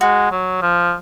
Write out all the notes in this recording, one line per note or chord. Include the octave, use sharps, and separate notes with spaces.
G#3 F#4
F#3
F3